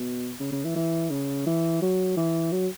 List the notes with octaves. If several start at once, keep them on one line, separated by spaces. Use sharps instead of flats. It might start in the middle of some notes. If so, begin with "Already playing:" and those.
Already playing: B2
C#3
C#3
E3
E3
C#3
E3
F#3
E3
F#3